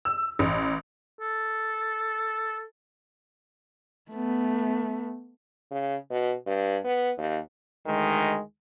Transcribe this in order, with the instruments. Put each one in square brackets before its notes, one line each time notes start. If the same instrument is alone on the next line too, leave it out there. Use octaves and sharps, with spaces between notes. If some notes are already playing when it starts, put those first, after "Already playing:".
[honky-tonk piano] E6
A1
[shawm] A4
[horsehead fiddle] A3 B3
[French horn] C#3
B2
G2
B3
D#2
[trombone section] D2 D#3 G#3